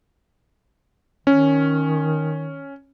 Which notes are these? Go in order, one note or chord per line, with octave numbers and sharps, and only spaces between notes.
D#3 C#4